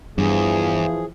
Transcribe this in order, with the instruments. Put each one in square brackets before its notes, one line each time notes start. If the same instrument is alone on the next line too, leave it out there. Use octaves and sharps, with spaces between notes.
[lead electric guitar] E2 [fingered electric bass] G2 [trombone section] E3 F3 [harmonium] G#4